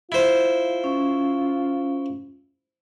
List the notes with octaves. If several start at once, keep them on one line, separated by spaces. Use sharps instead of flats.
E4 F4 C5
C#4